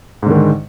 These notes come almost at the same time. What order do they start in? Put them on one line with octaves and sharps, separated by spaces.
G#2 D3 D#3 G#3